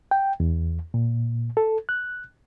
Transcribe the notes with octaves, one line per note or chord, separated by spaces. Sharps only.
G5
E2
A#2
A4
F#6